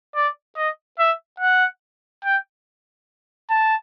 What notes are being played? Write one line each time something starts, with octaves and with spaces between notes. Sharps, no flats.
D5
D#5
E5
F#5
G5
A5